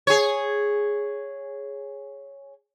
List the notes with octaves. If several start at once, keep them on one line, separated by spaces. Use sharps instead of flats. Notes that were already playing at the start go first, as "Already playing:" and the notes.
G#4 C#5